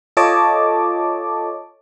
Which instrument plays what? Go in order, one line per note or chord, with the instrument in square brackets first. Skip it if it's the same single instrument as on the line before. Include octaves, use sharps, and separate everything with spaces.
[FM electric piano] F4 A4 C#5 D#5 A5 D6